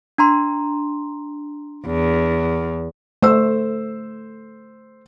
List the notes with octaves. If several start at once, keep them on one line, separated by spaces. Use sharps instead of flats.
D4 A#5 C6
E2
A3 C5 E6